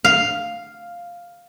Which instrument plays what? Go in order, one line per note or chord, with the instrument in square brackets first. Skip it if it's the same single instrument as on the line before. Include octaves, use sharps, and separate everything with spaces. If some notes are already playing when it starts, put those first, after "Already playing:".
[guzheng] F5